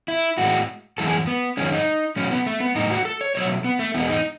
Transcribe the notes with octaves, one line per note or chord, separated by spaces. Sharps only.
E4
A2 G#3 F#4
F#2 E3 G#3 A4
G#4
B3
F#2 D#3 G#3 C#4
D#4
B2 F#3 A3 C#4
B3
A3
B3
A2 F#3 A3 D#4
F#4
A4
C#5
B2 F#3 A3 C#5
B3
A3
E2 B2 G#3 B3
D#4